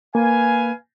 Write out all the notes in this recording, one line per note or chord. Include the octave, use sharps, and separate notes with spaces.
A#3 B4 F5 G#5